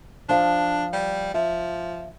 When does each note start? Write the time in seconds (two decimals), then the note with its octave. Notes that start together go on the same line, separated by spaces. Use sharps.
0.29 F3 D4 F5
0.93 G3
1.34 F3 E5